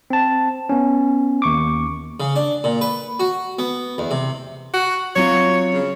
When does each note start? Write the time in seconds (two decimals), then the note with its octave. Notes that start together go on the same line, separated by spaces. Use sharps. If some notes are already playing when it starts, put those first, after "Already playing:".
0.10 C4 A5
0.69 B3 C#4
1.42 D#2 C#6 D6
2.20 C#3
2.36 D4
2.64 A#2
2.81 B4
3.20 F#4
3.59 B3
3.98 E2
4.11 C3
4.74 F#4
5.16 F#3 C4 F4 C#5
5.73 C#3